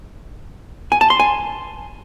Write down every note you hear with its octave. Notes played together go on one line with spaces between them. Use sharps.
G#5
A5
C6
G#5